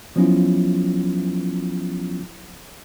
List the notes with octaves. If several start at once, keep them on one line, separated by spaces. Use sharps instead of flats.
F3 F#3 B3 C#4 E4 F4